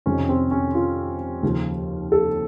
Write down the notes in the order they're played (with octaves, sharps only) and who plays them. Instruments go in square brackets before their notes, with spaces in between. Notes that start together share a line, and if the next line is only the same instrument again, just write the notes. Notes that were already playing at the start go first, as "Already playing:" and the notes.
[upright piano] F2 C3 D#3 C#4
C4
C#4
F4
D#2 C#3 F3
A4